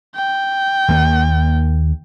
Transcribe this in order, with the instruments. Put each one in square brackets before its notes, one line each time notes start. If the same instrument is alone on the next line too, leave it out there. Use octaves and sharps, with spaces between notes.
[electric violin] G5
[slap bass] D#2 A#3